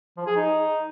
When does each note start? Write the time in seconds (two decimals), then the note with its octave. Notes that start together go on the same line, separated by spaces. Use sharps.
0.17 F3
0.27 G#4
0.36 D#4